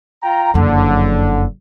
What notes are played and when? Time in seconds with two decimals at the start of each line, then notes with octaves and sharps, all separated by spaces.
0.23 F4 G5 A#5
0.54 F#1 F2 D3